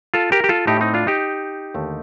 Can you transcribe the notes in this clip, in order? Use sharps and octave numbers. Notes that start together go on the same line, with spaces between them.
F4 A4
G4 A#4
G4
F4 A4
A2 A3 D#4 G4
C4 D#4
D4 F4
D#4 G4
D#2 D3 A3